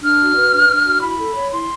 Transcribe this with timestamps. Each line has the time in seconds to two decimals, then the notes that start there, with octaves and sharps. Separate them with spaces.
0.03 D4 F6
0.20 F#4
0.37 B4
0.52 D4
0.70 D4
0.86 F#4
1.02 E4 B5
1.18 A4
1.35 C#5
1.51 E4 C6